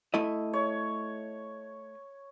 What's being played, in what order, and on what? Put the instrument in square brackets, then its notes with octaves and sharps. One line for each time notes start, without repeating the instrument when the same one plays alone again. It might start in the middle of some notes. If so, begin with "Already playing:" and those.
[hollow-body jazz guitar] A3 E4 D#5
[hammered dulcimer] C#5